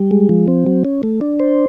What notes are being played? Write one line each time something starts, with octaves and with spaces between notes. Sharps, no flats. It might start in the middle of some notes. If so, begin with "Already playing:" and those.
Already playing: G3
G#3
F3
C4
F#3
C#4
A3
D4
C5